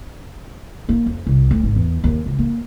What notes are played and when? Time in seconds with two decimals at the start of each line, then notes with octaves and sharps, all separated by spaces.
0.89 A#3
1.06 F2
1.27 C2
1.51 D2
1.63 G#1
1.76 E2
2.04 D#2
2.26 C#2
2.39 A#3